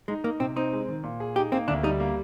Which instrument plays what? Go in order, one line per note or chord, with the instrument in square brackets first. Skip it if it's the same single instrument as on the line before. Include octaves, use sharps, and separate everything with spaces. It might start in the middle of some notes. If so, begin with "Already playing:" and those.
[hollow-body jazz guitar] G#3 [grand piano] D#4
[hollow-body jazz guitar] A#3 [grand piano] D#4
[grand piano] C3 [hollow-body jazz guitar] C4
[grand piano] C4 [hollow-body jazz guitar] D#4
[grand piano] G#3
D#3
A#2
G#4
[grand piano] D#4 [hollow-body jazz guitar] G4
[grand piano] A#3 [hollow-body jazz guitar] C4
[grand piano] D2 [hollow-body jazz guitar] D4
[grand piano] G3 [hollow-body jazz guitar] D#4
[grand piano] A#3